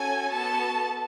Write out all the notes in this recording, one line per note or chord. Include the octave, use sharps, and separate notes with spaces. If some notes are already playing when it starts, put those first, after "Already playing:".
Already playing: C#4 F#4 A4 G#5
B3 F#4 A4 A5